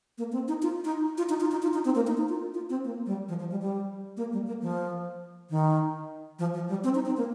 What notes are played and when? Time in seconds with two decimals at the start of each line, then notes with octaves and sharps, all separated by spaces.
0.18 A#3
0.32 C4
0.48 D#4
0.62 F4
0.85 D#4
1.18 F4
1.29 D#4
1.40 F4
1.51 D#4
1.62 F4
1.74 D#4
1.85 C4
1.95 A#3
2.07 D#4
2.17 D#4
2.29 F4
2.54 F4
2.70 C4
2.85 A#3
3.06 G3
3.28 F3
3.39 F3
3.51 G3
3.62 G3
4.17 A#3
4.33 G3
4.47 A#3
4.62 F3
5.50 D#3
6.39 F3
6.54 F3
6.68 G3
6.84 C4
6.95 D#4
7.06 C4
7.17 A#3